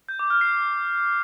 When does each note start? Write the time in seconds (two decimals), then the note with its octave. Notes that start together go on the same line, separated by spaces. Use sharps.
0.09 G6
0.19 D6
0.30 F6
0.41 C7